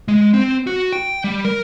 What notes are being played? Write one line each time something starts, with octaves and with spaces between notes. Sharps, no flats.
G#3
C4
F#4
G5
G3
A#4